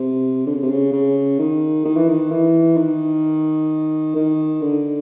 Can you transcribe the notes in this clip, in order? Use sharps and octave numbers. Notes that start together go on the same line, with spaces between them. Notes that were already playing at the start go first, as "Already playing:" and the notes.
Already playing: C3
D3
C#3
C3
C#3
C#3
D#3
D#3
E3
D#3
E3
D#3
D#3
D3